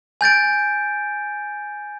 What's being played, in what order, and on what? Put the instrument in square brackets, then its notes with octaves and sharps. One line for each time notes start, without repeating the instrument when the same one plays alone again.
[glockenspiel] G#5 G6 A6 D7